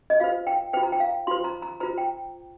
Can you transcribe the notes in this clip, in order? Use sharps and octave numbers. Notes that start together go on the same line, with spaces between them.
D#5
F4 C5 F5
G5
F4 C5 G5
A#5
G5
F5
F4 C5 C6
A#5
A#5
F4 C5 A#5
G5